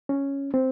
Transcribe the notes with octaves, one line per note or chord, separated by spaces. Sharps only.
C#4
C4